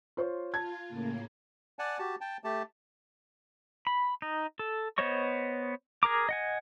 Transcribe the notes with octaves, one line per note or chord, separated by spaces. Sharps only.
F4 C5 C#5
F4 A5 G#6
A2 C#3 A#3
D5 F#5 G#5 A5
F#4 G4 A5
G5 A5
A3 G4 A5
B5
D#4
A4
B3 C5 C#5 D#5 C#6
G#4 A#4 A#5 D6
D#5 F#5 G#5